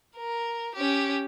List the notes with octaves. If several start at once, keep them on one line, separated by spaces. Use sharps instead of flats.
A#4
C#4 G4